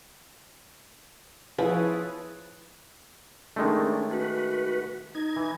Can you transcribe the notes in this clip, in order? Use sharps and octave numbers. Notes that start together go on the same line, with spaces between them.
F3 E4 G#4 B4 C#5
D#3 G#3 A3 C#4 D4
F#4 B4
D#4 G#6
E3